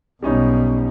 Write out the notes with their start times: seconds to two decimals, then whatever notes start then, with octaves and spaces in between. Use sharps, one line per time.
0.23 B1 B2 G3 C#4 D#4